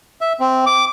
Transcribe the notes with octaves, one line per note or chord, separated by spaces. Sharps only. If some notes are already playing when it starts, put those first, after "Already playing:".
E5
C4
D6